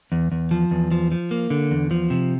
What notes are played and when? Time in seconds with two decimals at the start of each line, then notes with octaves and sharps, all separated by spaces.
0.12 E2
0.32 E2
0.51 F3
0.71 E2
0.92 F3
1.12 F3
1.31 A#3
1.50 D3
1.71 E2
1.91 F3
2.10 C3